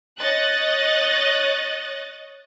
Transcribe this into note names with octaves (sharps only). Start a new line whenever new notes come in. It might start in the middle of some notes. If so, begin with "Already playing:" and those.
C#5 D#5 F#6 A6